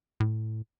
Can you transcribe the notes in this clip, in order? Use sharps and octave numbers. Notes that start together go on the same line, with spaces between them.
A2